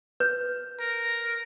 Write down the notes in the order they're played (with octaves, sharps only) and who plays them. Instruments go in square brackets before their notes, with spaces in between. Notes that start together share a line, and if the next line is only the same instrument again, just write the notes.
[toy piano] B4 [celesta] G6
[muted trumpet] A#4